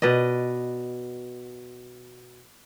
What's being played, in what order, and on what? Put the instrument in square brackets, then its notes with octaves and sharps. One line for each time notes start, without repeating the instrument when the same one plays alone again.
[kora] B2 B4 D5 D#5